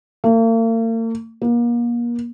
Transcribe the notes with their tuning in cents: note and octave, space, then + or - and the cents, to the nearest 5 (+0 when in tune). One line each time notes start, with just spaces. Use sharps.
A#3 -45
A#3 +35